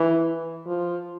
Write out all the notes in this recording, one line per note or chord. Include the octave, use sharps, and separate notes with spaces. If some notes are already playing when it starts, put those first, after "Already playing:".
Already playing: E3
F3